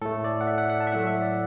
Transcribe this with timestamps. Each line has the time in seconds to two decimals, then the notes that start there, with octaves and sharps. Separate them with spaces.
0.02 A2 A3 A4
0.24 D5
0.41 F#5
0.47 E5
0.58 F#5
0.70 F#5
0.80 A5
0.87 E5
0.92 A2 F#3 A3 F#5
1.07 E5
1.22 D5